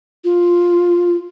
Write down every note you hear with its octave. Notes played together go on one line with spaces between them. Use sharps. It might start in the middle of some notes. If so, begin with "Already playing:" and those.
F4